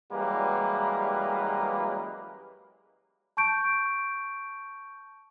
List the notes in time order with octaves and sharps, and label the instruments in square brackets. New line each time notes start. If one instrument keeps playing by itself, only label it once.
[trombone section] F#2 E3 G3 G#3 A#3 B4
[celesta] A5 C#6 G6 D7